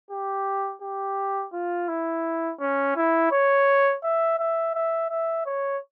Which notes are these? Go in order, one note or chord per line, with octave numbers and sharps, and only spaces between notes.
G4
G4
F4
E4
C#4
E4
C#5
E5
E5
E5
E5
C#5